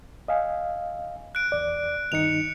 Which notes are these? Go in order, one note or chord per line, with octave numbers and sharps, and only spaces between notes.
D#5 F5 G#5
F#6 D7
E2 D5
G2 D#3 D#4 C#7 F7